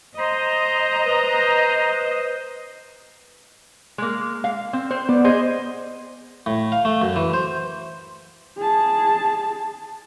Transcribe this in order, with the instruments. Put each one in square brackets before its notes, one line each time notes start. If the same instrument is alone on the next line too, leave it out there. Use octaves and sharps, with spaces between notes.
[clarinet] C5 [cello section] D#5 [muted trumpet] A#5 [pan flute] C6
[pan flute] B4
[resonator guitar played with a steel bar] G#3 A#3
F5
C4
C4 C5
[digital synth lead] B3 [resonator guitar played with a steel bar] D5
[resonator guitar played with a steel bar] G#4 C5 D#5
[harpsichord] A2
F5
A3
F#2
E3
C5
[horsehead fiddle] G#4 A5